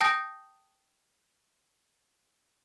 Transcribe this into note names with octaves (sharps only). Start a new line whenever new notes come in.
G5 A5 D#6 G6 A#6